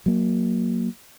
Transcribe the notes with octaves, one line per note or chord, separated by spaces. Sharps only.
F#3 A#3